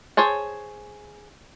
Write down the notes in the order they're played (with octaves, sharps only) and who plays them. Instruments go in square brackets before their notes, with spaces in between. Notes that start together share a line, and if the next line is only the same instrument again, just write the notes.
[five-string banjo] G#4 C5 C#5 A5